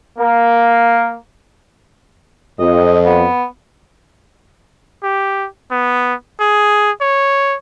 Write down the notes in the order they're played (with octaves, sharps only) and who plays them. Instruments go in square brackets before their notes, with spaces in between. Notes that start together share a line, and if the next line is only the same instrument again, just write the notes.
[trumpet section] A#3
[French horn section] F2 [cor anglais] D#5
[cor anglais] B3
[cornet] G4
B3
G#4
C#5